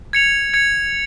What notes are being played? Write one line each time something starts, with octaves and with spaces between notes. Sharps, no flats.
G#6 C#7 F7
G#6 C#7 F7